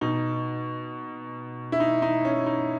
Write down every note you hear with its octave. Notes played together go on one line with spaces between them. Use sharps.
B2 D#4
E4
D#4
D#4
C#4
D#4